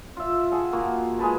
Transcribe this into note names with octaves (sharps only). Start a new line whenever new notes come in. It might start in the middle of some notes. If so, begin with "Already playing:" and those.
F4 E5
G#4 F#5 A5
A#3 F4 F#4
G#3 G#4 B4 A5